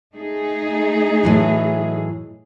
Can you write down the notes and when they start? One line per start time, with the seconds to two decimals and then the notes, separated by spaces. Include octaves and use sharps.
0.15 A3 D#4 G#4
1.23 A2 E3 F#3